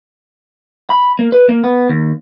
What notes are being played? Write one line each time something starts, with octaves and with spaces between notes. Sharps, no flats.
B5
A#3
B4
A#3
B3
D#2